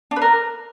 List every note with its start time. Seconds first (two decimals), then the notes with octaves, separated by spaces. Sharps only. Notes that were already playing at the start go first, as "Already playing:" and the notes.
0.11 D4
0.16 B4
0.22 A#4